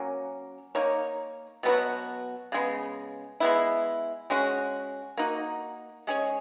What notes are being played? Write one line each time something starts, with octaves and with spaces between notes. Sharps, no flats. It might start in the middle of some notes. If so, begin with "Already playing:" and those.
Already playing: F#3 A#3 C#4
A#3 D#4 A#4 C#5
B2 F#3 B3 F#4
C#3 G#3 B3
G#3 B3 E4
G#3 C#4 F#4
A#3 D#4 F#4
G#3 C#4 G#4 C#5